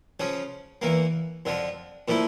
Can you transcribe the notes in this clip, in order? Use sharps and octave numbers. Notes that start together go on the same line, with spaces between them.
C#3 F3 C#4
E2 E3 A#3
F2 D3 F3
A#2 F3 A3 E4